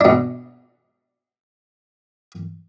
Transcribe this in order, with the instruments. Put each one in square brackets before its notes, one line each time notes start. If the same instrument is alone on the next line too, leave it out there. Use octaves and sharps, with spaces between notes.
[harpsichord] B2 D4